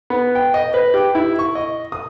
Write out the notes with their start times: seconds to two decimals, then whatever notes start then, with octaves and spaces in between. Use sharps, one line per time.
0.10 B3
0.35 G5
0.54 D#5
0.74 B4
0.94 G4
1.15 E4
1.39 C#6
1.55 D#5
1.92 D#6